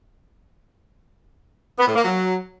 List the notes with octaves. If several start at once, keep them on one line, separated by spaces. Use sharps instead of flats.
B3
A2
A#3
F#3